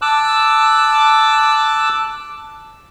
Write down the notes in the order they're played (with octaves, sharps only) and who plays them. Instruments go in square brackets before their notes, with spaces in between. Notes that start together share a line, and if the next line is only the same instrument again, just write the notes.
[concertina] A5 D6 E6 F#6